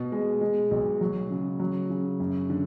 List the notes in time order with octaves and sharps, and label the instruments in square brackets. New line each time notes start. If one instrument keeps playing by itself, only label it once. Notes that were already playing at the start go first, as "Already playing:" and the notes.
Already playing: [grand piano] B2
G#3
G#3
B1
F#3
C#3
F#3
C#3
F#2
D3